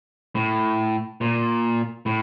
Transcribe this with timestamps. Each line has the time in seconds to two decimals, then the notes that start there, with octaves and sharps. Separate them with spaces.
0.35 A2
1.21 A#2
2.06 A2